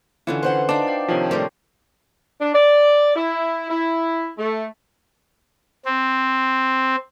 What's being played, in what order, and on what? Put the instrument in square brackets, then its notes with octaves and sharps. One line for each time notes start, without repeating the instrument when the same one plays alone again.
[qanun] D3 C#4 F4 [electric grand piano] E3 [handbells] B4
[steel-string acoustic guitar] B4 C5 F#5 [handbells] C6 F#6
[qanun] D4 D#4 [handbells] D5 F5 [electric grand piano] D6 E7
[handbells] F5 G5 A5
[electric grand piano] C3 D#3 F3 [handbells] F4 C#5 G5
[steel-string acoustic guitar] A2 G3 A3 [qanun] G4 A#4 C5
[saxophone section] D4
D5
E4
E4
A3
[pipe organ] C4